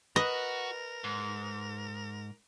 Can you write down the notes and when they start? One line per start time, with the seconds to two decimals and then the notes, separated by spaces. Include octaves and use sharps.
0.16 F#4 A#4 B4 D#5
1.04 G#2